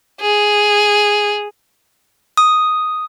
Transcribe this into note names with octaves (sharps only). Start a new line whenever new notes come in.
G#4
D#6